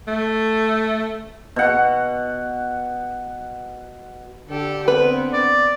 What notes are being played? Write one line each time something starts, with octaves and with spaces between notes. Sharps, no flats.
A3
B2 F#5
D3 G4 A4
B3 C4 B4
D5